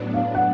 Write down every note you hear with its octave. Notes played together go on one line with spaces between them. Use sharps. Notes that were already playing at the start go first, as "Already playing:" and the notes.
Already playing: A2 F#3 B3 D4
F5
F#5